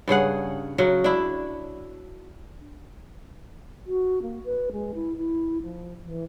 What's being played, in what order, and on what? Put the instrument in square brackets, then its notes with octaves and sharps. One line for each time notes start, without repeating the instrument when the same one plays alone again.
[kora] G2 C#3 G#4 F#5
C#3 F#3 F#4
D4 E4
[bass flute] F#4
A#3
B4
G#3
E4
E4
F3
E3